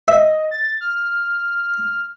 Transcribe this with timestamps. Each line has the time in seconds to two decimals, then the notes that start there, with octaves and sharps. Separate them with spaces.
0.08 D#5 E5
0.51 A6
0.81 F6